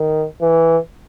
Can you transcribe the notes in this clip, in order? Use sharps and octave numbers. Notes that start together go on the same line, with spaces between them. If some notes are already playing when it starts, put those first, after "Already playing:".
Already playing: D#3
E3